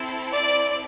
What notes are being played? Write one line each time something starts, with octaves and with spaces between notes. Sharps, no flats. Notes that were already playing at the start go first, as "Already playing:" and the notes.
Already playing: C4 E4 A4
D5